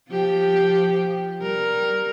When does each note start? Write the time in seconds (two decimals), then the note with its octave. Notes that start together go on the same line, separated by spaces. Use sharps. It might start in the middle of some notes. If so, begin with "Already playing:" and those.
0.10 F3 G4
1.40 G3 A#4